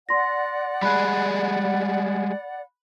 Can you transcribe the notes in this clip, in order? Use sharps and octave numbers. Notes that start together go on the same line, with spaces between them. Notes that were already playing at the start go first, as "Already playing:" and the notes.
D5 F#5 C6 A#6
G3 G#3 G#4 B5 F#6